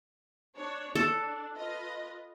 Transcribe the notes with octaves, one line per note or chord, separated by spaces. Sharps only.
D4 C#5
D4 A4
F4 B4 D#5